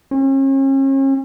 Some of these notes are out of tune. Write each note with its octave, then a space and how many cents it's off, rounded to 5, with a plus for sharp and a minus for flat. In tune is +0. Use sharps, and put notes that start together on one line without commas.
C#4 -40